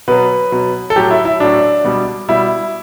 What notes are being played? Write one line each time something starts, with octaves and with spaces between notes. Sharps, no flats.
B2 F#3 B4
B2 F#3
A4
A2 F#3 G4
E4
E4
A2 F#3 D4
B2 G3
B2 G3 E4